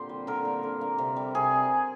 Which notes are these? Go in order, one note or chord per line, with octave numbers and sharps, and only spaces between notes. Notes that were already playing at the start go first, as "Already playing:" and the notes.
Already playing: A#2 D3 A#3 C4 G4 C5
G3
D3 A#4
A#3
D3
A#3
C3
G3
C3 G#4